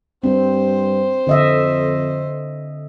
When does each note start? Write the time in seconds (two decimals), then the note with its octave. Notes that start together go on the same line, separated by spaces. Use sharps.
0.24 G2 C4 C5
1.27 F2 D3 D#5 E5